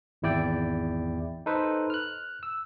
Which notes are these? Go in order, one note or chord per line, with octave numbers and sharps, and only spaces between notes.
G#1 E2 E4 D5 G5
D#4 A4 B4 C5
F6 F#6
E6